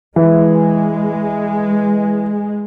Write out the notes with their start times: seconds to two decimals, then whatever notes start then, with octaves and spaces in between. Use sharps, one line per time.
0.16 E3 G#3